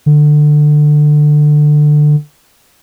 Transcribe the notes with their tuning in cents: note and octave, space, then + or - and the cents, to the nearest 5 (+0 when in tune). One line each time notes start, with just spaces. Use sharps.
D3 +20